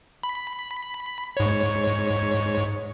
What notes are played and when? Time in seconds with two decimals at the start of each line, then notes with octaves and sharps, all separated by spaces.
0.23 B5
1.37 G#2 C#5